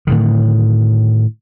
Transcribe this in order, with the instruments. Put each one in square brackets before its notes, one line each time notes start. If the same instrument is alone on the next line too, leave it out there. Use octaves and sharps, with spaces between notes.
[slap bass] A2 D3 D#3